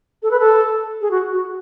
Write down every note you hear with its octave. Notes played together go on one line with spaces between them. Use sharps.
A4
B4
A4
G#4
F#4
F#4